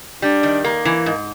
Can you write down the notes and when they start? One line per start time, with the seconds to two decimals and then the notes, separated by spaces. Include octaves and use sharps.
0.22 G3 D4
0.43 D#3
0.64 A#3
0.85 E3
1.06 G#2